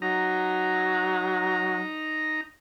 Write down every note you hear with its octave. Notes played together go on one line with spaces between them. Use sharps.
F#3 D#4 A#5